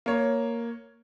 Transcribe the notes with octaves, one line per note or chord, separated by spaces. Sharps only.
A#3 C#5